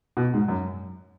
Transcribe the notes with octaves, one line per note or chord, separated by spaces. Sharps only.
B2
G#2
F#2